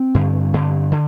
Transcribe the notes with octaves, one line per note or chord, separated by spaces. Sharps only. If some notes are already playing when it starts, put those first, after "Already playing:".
Already playing: C4
G2 D3
G2 D3
D3